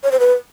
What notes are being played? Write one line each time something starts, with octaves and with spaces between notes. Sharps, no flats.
C#5
C5
B4